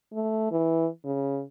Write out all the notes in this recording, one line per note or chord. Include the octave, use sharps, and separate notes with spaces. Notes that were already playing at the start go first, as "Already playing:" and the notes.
A3
E3
C#3